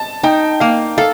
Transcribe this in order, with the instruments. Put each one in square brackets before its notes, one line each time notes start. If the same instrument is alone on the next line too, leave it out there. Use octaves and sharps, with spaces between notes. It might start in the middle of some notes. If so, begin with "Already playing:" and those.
Already playing: [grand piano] A5
[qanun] D#4 [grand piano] G5
[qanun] A#3 [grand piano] F5
[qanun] A4 [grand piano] F5